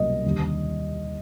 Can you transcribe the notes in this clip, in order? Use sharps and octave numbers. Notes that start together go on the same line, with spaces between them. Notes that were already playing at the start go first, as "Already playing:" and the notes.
Already playing: C2 B2 F#3 A#3 C#4 D#5
D#2 D3 G3